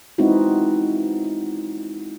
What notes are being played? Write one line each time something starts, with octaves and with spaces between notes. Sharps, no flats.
G#3 B3 C4 D#4 E4 F#4